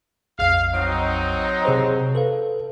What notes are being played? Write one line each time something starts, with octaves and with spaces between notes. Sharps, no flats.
A#1 F2 F5
F#3 C4 D#4
C3 G#4 C5
A4 B4 F5